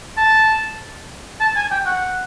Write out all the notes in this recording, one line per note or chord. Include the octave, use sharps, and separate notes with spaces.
A5
A5
G#5
G5
F#5